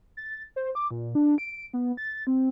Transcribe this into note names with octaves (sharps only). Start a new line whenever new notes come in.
A6
C5
D6
A#2
D4
D7
B3
A6
C4